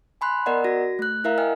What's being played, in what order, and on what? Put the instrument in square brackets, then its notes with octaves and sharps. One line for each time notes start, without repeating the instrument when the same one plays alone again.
[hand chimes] G#5 B5 C6 F#6
B3 A#4 D5 D#5 F#5 A#5
F#4 A#6
A3 F#6
E4 A#4 E5 F5 A#5
D#5 G5 G#5 F6